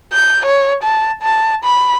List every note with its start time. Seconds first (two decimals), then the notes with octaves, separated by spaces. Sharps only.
0.13 G6
0.46 C#5
0.84 A5
1.22 A5
1.64 B5